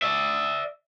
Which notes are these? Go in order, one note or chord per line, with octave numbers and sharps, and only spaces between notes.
D5 E5